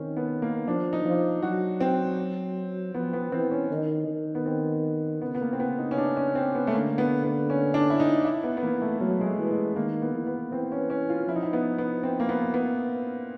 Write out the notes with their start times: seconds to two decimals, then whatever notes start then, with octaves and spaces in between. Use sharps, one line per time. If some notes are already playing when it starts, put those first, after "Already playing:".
Already playing: D#3 C4 C#4
0.17 B3
0.42 A#3
0.67 F3 D4
0.93 D#4
1.05 F3
1.42 F#3 F#4
1.81 C4
2.94 F3 B3
3.13 B3
3.32 E3 C4
3.51 C#4
3.71 D#3
4.08 D#3
4.35 B3
4.46 C4
5.22 C#3 B3
5.35 B3
5.41 A#3
5.53 C4
5.60 B3
5.79 D#4
5.91 C#4
5.98 D4
6.17 C#4
6.35 C4
6.55 B3
6.67 A3
6.74 D3 A#3
6.98 B3
7.24 B3
7.50 C#4
7.74 D4
7.90 E4
8.00 D#4
8.25 E4
8.43 B3
8.57 B3
8.63 E3 A#3
8.82 A3
9.00 F#3 A#3
9.20 G#3
9.26 A3
9.38 E3
9.51 G#3
9.76 D#3 A#3
10.02 B3
10.15 E3
10.27 B3
10.52 E3 C4
10.72 C#4
10.90 C#4
11.09 F4
11.28 F3 E4
11.36 D#4
11.43 E4
11.53 B3
11.78 B3
12.03 C4
12.20 A#3
12.29 B3
12.54 B3